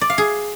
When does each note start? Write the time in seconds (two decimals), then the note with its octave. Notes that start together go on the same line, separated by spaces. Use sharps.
0.01 D5
0.10 F5
0.18 G#4